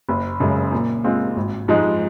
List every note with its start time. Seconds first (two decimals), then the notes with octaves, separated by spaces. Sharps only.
0.09 F#1
0.40 F#2 C#3 G#3
0.72 A#2
1.04 G#3 C4 F4
1.37 G#1
1.68 G#2 F3 G#3 D#4